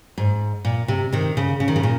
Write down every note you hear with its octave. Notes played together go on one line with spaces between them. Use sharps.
G#2
A#2
C3
C3 D#3
C#3
C#3
D#3
C#3
A#2